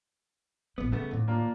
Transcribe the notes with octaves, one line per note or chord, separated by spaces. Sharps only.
A1 D#3 B3
C#3 G3 A3 B3
D#2 A2 D3
A#3 D4 F4